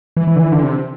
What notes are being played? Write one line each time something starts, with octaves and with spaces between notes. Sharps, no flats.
E3
E3
D3
E3
D3
C3